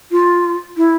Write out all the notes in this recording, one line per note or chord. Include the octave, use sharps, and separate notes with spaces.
F4
E4